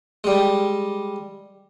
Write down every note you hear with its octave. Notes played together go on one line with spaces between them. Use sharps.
G3 G#3